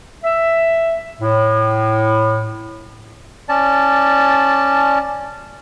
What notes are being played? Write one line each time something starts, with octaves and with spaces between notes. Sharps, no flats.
E5
A2
C#4 D5 A5